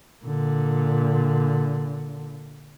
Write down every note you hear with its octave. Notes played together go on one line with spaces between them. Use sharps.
A#2 D3